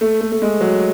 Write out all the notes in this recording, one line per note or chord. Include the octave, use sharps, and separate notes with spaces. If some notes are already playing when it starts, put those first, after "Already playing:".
A3
A3
A3
G#3
F#3